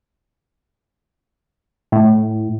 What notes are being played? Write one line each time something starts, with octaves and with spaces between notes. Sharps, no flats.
A2